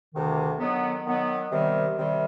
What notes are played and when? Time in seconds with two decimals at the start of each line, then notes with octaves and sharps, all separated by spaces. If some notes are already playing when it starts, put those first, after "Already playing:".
0.14 D2 C3 D#3
0.60 D#3 F#3 B3
1.05 D#3 F#3 B3
1.49 C3 D#3 G3
1.95 C3 D#3 G3